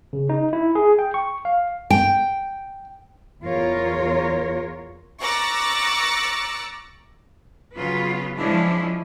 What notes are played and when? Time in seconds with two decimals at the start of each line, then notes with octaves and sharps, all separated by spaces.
0.13 C#3
0.29 D#4
0.53 E4
0.75 G#4
0.99 G5
1.14 C#6
1.45 F5
1.90 G5
3.42 E2 F4 A#4 C#5
5.21 A#5 C#6 D6 E6 F#6 A6
7.75 C#3 F#3 B3 F4 B4
8.36 F3 G#3 C#4 D4 E4